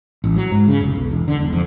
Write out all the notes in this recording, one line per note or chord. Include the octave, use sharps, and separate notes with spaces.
A1
F#3
G#2
C#3
F1
B1
E1
D3
E1
F2